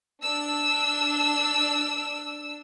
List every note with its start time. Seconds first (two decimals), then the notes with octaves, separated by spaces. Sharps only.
0.21 D4 E6